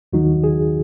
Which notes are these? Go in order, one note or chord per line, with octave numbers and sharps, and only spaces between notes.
D#2 D#3 F#3 D#4 F#4
G#4